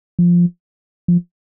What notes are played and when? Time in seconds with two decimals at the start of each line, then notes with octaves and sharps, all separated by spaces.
0.19 F3
1.08 F3